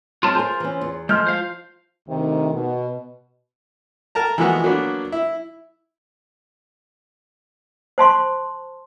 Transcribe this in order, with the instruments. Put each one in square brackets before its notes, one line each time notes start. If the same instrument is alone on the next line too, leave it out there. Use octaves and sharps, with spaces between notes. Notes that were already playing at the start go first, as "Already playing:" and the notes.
[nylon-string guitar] F#3 G#3 C4 [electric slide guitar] F4 A#4 A5
[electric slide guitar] F4 C5 [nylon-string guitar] G#4 A#4
[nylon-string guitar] E3 C#4
E2
[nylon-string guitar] F3 [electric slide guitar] G#3 [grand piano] C6 F6 G6
[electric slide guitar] C5 F5
[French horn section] D2 C3 D#3
B2
[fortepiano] A#4 A5 A#5
E3 F3 G#3 A#3 B3 F#4
F#3 A#3 B3 D4
E4
[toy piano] C5 A5 C6 C#6